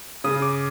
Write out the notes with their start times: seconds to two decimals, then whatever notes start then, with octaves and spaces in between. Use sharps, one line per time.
0.24 C#3 D#6
0.42 D6